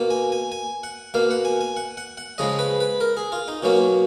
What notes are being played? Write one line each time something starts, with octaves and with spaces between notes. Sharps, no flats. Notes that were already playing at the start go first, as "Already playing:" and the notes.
Already playing: B2 A#3
G#5
G#5
G#5
F#5
B2 A#3 F5
F#5
G#5
G#5
F#5
F#5
F#5
C#3 F3 G#3 D#5
B4
B4
A#4
G#4
F4
D#4
B2 F#3 A#3 C#4